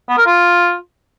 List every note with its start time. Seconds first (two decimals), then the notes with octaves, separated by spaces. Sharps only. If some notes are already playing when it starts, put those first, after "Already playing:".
0.09 B3
0.18 A#4
0.27 F4